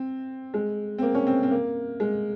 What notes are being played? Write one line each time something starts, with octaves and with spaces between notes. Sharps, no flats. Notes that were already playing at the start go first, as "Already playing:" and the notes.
Already playing: C4
G#3
C4
A#3
C#4
C4
C4
A#3
G#3